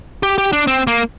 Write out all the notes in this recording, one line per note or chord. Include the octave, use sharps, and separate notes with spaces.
G4
G4
D4
C4
A#3